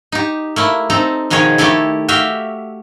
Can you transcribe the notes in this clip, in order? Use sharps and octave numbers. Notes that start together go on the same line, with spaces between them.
D#4 G4
A3 A#3 E4
C4 D#4 A4 A#5
B2 D#3 F3 G#4 C#5
D#3 A3 E4 G4 A4
F#4 G4 E5 F5 G5